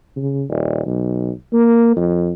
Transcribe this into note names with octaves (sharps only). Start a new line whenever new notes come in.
C#3
D#1
B1
A#3
F2